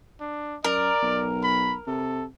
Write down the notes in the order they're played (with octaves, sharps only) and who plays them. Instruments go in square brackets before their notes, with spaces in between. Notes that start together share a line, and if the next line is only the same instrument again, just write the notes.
[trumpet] D4
[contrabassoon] F#2 [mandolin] A#4 [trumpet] D5
[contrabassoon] B1
[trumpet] B5
[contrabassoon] C3 [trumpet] A4